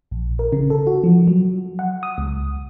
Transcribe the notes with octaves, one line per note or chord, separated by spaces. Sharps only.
A#1
A#4
C#3
A4
F#4
F3
F#3
F#5
D#6
C#2